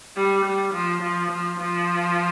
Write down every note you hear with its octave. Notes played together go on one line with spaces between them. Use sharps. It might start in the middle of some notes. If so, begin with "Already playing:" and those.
G3
G3
F3
F3
F3
F3